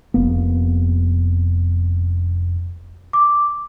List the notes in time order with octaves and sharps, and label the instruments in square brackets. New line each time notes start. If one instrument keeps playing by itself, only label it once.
[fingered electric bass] F1 A#3 B3
[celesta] D6